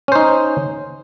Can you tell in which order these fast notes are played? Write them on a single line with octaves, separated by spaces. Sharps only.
C#4 C5 D#4